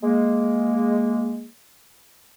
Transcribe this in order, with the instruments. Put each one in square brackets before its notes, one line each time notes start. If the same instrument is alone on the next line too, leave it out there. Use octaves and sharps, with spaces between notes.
[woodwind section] G#3 A#3